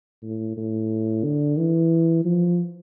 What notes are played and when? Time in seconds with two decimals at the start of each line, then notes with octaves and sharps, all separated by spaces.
0.23 A2
0.57 A2
1.24 D3
1.58 E3
2.25 F3